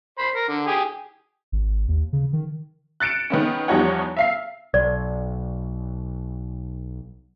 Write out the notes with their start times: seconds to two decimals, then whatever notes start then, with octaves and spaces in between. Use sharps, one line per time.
0.18 C5 B5
0.36 A#4
0.49 D3
0.67 G4 G#4
1.52 G#1
1.88 D#2
2.13 C#3
2.33 D#3
3.00 F#6 A6 C#7 D7 E7
3.30 D#3 B3 C#4
3.68 E2 F3 G3 D#4 C#5 F#5
4.17 E5 F5 C7
4.74 B1 D5